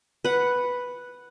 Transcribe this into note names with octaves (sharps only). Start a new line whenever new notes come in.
B4 F#5